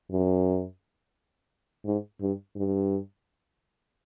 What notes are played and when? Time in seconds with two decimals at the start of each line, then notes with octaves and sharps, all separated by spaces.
0.12 F#2
1.86 G#2
2.21 G2
2.56 G2